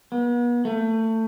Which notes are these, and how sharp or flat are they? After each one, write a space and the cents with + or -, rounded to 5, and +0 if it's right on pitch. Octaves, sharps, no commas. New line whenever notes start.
B3 -40
A3 +25